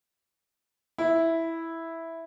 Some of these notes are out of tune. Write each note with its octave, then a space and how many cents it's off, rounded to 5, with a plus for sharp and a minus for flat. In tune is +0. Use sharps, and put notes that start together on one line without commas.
E4 -5